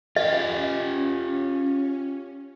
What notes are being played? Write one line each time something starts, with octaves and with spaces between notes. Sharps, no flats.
C#4 F4 G4 D#5